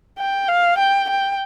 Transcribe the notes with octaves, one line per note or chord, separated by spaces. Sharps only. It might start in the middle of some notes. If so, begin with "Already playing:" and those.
G5
F5
G5
G5